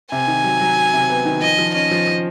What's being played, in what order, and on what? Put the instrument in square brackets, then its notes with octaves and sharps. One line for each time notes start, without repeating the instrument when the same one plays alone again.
[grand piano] C3 [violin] G#5
[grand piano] D#3
F#3
F#3
F#3
C3
B3
D#3
[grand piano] F3 [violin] D#5
[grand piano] F3
[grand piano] C#4 [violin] D#5
[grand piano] F3
F3